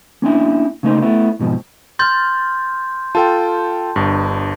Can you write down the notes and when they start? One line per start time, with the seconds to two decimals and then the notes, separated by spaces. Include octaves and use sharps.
0.22 A#3 C#4 D4 E4
0.83 C#3 A3 A#3 D#4 C5
1.02 A3 B3 E4
1.40 F2 G#2 B2 F3
1.99 C6 F6 G6 A6
3.15 F4 A4 G5 A5
3.96 G1 G2